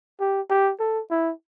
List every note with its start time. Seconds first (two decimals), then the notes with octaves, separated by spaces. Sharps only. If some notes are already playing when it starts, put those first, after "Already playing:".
0.20 G4
0.50 G4
0.80 A4
1.11 E4